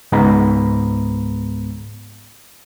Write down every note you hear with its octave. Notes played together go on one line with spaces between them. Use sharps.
C#2 G#2 G#3 B3 A#5 B5